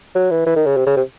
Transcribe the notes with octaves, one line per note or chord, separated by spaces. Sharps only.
F#3
E3
E3
D#3
C#3
C3
C#3
C3